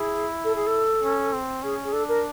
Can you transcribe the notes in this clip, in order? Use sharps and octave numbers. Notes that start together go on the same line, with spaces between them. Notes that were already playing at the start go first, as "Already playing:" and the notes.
Already playing: E4 G#4
A4
G#4
A4
C#4
C4
C#4 G#4
G#4
D4 A4
A#4